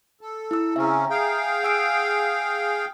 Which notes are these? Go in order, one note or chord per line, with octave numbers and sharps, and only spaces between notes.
A4
E4 E6
C#3 C4 C#4 E5 A#5
G#4 F5 G5
F#5 E6 D7